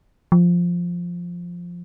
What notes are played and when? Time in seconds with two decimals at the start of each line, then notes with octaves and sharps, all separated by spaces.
0.32 F3